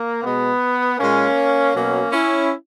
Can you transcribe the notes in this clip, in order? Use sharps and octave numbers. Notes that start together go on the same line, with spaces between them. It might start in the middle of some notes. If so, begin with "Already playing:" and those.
Already playing: A#3
B2 G#3 B3
A#2 G#3 A#3 C#4
B2 F#3 A#3 C#4
C#4 E4